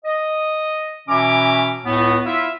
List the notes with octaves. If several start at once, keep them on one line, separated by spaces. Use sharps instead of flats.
D#5
B2 E3 C#4 E5 A#5 D6
C#2 A2 B3
E4 F4 E5